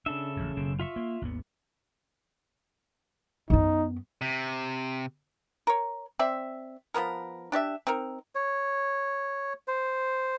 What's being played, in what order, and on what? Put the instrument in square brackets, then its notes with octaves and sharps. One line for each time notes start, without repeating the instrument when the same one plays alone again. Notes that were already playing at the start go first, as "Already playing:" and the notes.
[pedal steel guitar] C#3 A4 E5 [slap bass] D4
[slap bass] A1 F2
F#1 F#2 B2
[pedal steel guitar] F4 E5 C#6
[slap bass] A#3
G#1 D#2 B3
[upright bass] F#2 B3 [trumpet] D#4
[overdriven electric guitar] C3
[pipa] A#4 C#5
C4 D5 E5
F3 F#3 B3 A#4
D4 G4 C#5 E5
C4 D#4 A#4
[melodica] C#5
C5